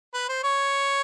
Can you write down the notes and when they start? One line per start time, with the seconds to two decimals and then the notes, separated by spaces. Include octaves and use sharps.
0.14 B4
0.29 C5
0.43 C#5